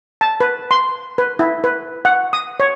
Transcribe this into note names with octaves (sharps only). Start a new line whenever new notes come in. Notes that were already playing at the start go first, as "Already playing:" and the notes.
A5
B4
C6
B4
E4
B4
F#5
D#6
C#5